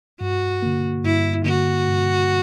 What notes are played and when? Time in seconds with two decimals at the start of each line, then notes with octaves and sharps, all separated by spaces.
0.21 G2 F#4
0.62 D3 A#3
1.04 G2 E4
1.46 D3 A#3 F#4
1.88 G2